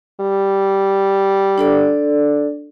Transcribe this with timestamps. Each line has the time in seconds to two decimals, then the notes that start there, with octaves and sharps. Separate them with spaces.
0.20 G3
1.58 D4 A4 D5